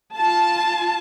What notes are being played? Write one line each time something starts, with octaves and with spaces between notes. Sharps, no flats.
F4 A5